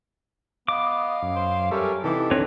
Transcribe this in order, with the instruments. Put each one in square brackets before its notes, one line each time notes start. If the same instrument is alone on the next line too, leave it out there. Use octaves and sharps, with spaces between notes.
[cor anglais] B3 [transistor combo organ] D#5 [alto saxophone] F5 [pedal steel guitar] D6
[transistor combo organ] F#2
[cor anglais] C5
[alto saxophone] G3 [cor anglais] C#4 [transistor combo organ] A4 A#4 E5
[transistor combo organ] C3 D#4 A4 [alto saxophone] E3 [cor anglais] G4
[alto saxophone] D3 [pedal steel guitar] C4 B4 C#5